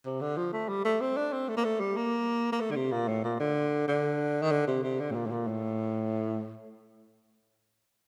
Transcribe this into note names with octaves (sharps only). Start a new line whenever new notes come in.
C3
D3
F3
A3
G3
A3
C4
D4
C4
A3
A#3
A3
G3
A#3
A#3
A3
D3
C3
A#2
A2
A#2
D3
D3
D#3
D3
C3
C3
D3
A2
A#2
A2
A#2
A2